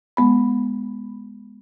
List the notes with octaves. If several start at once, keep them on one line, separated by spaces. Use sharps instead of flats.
G#3 B3 B5